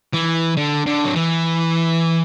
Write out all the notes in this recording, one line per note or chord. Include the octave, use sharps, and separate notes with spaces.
E3
D3
D3
F#3
E3